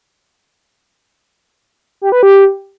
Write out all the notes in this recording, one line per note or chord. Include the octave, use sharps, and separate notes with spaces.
G4
B4
G4